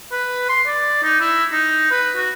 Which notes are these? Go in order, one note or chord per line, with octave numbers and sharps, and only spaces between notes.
B4
C6
D5
D#4
E4
D#4
B4
F#4